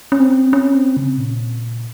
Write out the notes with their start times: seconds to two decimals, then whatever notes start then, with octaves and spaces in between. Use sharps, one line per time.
0.12 C#4
0.20 C4
0.53 C#4
0.75 C4
0.97 C#3
1.18 A#2